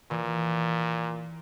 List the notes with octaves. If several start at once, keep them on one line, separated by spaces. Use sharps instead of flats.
A#2 E3